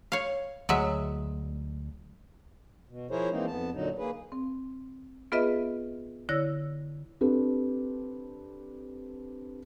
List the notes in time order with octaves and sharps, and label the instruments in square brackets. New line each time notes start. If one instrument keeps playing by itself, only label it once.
[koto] C#5 F5
[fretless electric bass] D2 [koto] F#3 G#3 E5
[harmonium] B2
F3 E4 G#4 A#4 C5 C#5
E3 G#3 A#3 C4 D#4
F2 B3 A5
A#2 D3 F#3 D#4
A#3 G#4 B4
[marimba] C4
B3 F4 G#4 B4 D#5 E5
D3 E4 C#5 E6 A#6
[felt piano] C4 D4 G4 A4 B4